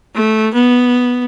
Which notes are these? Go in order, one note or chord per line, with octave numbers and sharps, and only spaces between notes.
A3
B3